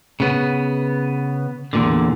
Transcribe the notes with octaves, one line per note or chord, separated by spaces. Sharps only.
C#3 B3
E2 A#2 D3